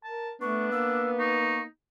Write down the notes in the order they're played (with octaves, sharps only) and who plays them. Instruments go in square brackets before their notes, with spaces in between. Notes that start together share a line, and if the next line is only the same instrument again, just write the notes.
[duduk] A#4 [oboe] A5
[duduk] A3 [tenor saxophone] B3 [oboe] D4 [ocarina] C#6
[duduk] A#3 [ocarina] E6
[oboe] D#4 [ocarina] C#6